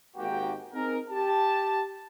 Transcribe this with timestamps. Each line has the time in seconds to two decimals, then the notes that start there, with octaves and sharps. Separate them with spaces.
0.17 G#1 G#2 A#3 F#4 G4 G5
0.73 C4 D#4 G#4 A#4
1.11 G4 A5